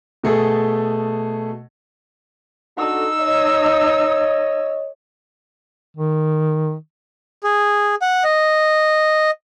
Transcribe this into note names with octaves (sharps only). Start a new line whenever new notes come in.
B2 A3 G#4 A4
D4 D#4 F#4 A4 E6
C#5 D#5
D#3
G#4
F#5
D#5